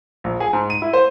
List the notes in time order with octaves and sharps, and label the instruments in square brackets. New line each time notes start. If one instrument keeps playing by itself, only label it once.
[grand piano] A#1
G#4
G#2
D#7
E4
C5